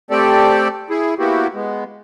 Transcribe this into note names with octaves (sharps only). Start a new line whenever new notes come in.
A3 C4 G4 A4 D5
E4 G#4
A#3 B3 E4 F#4 G4
G#3 B3